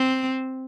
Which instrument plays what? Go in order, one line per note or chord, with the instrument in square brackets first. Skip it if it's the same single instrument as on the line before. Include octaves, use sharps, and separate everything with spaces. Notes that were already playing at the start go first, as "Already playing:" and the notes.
Already playing: [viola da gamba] C4